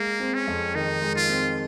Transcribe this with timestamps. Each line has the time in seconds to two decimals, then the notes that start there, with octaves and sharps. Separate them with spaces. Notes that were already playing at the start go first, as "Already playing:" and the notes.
Already playing: G#3 A#3
0.20 C4
0.34 C#4
0.47 F2
0.75 D#3 D#4
1.02 G#3
1.16 F4
1.29 C4